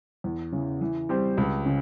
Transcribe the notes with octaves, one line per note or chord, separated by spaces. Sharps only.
E2
C#3 E3
E3
G3 C4 G4 C5
C#2
C#3